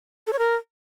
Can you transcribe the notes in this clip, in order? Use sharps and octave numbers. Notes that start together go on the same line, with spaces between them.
A4
C#5
A#4